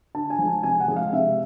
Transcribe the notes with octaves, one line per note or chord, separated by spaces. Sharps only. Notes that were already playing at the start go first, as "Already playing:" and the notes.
D3 A5
G#5
F3 G#3
A5
C3 G#5
F#5
F3 G#3
F5
C3 E5